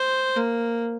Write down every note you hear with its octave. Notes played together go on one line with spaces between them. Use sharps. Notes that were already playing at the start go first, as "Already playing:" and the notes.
Already playing: C5
A#3